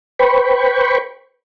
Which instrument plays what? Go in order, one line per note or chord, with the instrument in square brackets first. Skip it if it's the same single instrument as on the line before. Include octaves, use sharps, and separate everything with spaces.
[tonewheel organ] B4 C5 G5 B5 C#6